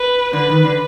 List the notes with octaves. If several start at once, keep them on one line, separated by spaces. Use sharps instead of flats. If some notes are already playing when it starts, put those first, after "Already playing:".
Already playing: B4
D3 B4
D#3
D3